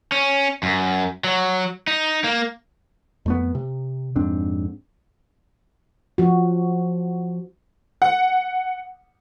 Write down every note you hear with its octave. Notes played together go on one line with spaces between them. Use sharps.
C#4
F#2
F#3
D#4
A#3
F2 A3 B3
C3
F2 G#2 C4 D4
F3 F#4
F#5